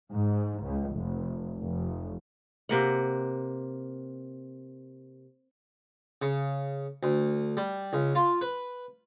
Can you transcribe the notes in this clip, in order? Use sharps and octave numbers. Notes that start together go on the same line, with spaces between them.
G#2
C#2
F1
F1
C3 A#3 F#5
C#3
D2
G3
C#2
F4
B4